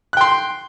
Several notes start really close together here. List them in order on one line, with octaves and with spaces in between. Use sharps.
F#6 G5 C6